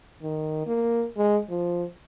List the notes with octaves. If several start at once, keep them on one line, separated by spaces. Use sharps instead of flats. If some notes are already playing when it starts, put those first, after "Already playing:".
D#3
A#3
G#3
F3